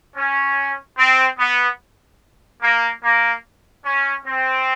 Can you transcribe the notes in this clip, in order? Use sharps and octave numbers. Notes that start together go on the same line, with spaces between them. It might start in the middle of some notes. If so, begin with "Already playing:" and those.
C#4
C4
B3
A#3
A#3
C#4
C4